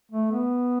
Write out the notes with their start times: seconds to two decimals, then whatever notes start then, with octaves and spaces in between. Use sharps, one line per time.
0.11 A3
0.32 B3